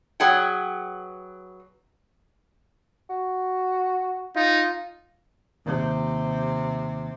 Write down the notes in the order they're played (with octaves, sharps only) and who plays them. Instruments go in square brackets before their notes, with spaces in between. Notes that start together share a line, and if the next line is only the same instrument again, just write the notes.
[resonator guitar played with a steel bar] F#3 G#4 B4 F#5 G5
[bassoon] F#4
[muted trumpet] D#4 [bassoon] F4
[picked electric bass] D#2 [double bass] C3